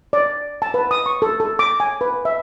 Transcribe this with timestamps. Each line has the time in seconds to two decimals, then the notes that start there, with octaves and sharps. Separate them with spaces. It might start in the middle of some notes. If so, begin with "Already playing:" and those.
0.13 D5
0.62 A5
0.74 B4
0.91 D#6
1.06 C#6
1.22 A4
1.40 A4
1.59 D6
1.80 G#5
2.01 B4
2.25 E5